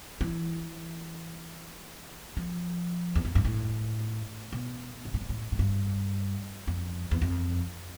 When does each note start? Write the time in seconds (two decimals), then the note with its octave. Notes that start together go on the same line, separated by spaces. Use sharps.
0.21 E3
2.37 F3
3.15 E2
3.25 F2
3.35 G2
3.45 A2
4.53 B2
5.05 B2
5.14 A2
5.21 G2
5.29 A2
5.52 A2
5.59 G2
6.67 F2
7.11 E2
7.22 F2